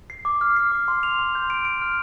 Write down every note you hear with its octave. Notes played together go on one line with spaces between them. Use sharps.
C7
D6
F6
C7
D6
C6
F7
C6
G6
D7
D7
F6